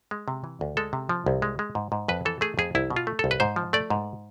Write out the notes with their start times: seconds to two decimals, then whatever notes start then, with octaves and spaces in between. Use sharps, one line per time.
0.11 G#3
0.28 C3
0.44 E3
0.61 D2
0.77 G#3 A4
0.93 C3
1.09 F3
1.26 C2
1.42 G#3
1.59 G#3
1.75 G#2
1.92 G#2
2.08 F2 B4
2.25 E3 A4
2.41 A3 G#4
2.58 F2 G#4
2.75 C2 E4
2.90 B2
2.96 F4
3.07 A3
3.19 C2 A4
3.31 B4
3.40 G#2 C5
3.56 F3
3.73 A3 D5
3.90 G#2